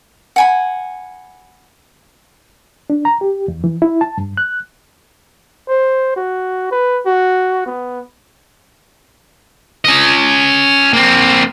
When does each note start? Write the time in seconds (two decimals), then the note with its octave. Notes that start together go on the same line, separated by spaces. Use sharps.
0.36 F#5 G#5 B5
2.90 D4
3.05 A#5
3.21 G4
3.48 E2
3.64 E3
3.82 E4
4.01 A5
4.18 G2
4.37 F#6
5.68 C5
6.16 F#4
6.71 B4
7.06 F#4
7.66 B3
9.85 C#4 D#5
10.93 A#3 C4